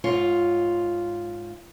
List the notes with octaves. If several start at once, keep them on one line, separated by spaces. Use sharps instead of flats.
G#2 F4 C#5